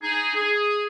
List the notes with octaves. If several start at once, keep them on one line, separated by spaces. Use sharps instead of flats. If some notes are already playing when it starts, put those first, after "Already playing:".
D#4 G#4
G#4